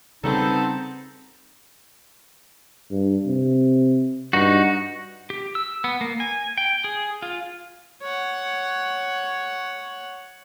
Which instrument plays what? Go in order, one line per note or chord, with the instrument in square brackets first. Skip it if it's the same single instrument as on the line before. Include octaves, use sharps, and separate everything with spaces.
[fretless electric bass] C#3 G3 [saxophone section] B3 A4 [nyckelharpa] C4 [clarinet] D#4
[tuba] G2
C3
[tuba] G2 [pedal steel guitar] D#4 F#4
[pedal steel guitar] G4
E6
B3
A#3
G#5
G5
G#4
F4
[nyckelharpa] C#5 F#5